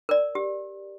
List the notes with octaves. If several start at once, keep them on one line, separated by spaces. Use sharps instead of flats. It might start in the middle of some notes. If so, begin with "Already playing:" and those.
A#4 D5
G4